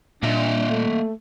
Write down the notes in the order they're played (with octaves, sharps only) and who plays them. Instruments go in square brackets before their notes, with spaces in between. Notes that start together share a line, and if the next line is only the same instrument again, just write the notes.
[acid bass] A#2 [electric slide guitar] A#3 D#5 E5 [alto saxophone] D4
[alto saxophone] A3